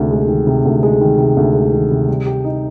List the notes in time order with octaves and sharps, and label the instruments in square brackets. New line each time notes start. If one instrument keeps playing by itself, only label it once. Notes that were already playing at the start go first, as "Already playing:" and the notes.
Already playing: [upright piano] D2 C3 D#3 G#3
G#3
D#3
C3
D2
G#3
D#3
C3
D2
G#3
D#3
C3
G3
G4
D#4